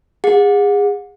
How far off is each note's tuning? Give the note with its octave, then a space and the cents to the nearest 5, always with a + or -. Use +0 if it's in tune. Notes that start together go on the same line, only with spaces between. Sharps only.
G#4 -30 F#5 -35